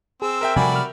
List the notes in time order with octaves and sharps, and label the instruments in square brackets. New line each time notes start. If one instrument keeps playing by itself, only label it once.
[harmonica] C4 E6 [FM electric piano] G#4
[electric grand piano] A#4 E5 G5
[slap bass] C3 F3 G3 [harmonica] F#4 D5 B5 [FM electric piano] G#5
[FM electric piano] D6 F6